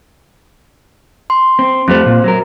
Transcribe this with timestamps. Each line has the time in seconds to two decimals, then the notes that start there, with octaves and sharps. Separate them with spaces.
1.30 C6
1.59 C4
1.88 F2 G3 A3 C4 C5
2.06 A#2
2.24 F#3 A#4